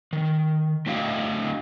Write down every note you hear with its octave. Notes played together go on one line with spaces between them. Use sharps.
D#3
A3 D4 E4 F#4 F5 G5